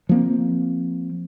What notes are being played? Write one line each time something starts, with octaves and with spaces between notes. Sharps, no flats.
F3 A#3 C4